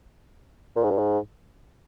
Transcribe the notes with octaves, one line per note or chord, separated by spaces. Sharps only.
A#2
G#2
G2
G#2